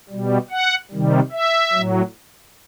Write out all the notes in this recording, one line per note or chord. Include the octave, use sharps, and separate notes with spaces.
B2 G3
F#5
C3 D#3 G3
E5
A2 F#3